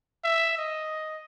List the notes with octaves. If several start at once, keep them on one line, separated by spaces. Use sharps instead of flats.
E5
D#5